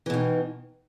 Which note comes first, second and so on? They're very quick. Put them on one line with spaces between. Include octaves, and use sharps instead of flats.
E3 B2 D#3